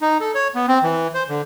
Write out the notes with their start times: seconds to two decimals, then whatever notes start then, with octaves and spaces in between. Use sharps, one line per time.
0.01 D#4
0.21 A4
0.35 C#5
0.55 B3
0.68 C4
0.83 E3
1.14 C5
1.29 D3